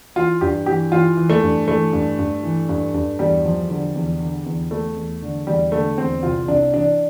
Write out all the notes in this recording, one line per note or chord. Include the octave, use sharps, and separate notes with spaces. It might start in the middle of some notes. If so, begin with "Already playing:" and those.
E3 F4
G2 G4
E3 G4
E3 F4
E3
A3
G2
E3 A3
G2
G2
E3
G2
G2
E2 G3
F3
D3
E2
D3
E2
E2 A3
E2
D3
E2 G3
D3 A3
E2 C4
C2 F4
C2 D4
E3 D4